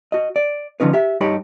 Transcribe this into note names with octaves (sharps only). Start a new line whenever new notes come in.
F#4 D#5
D5
D3 F3 C#4 D#4 B4
G4 E5
G2 D#4 G4 C#5 B5